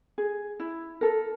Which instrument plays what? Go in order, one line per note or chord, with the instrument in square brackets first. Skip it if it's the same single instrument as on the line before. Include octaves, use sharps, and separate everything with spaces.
[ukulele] G#4
E4
A4 A#4